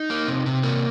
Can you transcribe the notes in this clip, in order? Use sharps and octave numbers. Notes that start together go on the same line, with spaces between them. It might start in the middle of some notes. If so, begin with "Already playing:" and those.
Already playing: D#4
A#3
C3
C3
A#3